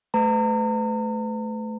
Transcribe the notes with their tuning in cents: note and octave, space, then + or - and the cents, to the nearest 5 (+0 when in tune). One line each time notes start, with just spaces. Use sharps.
A3 -15 B4 +40 A#5 -40